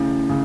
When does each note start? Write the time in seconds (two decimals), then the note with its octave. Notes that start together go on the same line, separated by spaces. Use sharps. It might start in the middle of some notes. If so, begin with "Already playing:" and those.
Already playing: C#3 A3 C#4 E4
0.29 C#3